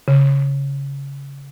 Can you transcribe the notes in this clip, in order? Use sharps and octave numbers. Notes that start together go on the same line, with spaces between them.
C#3